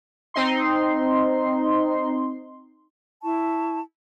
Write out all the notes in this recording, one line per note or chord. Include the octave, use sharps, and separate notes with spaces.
C4 D#4 C6
E4 A5 C#6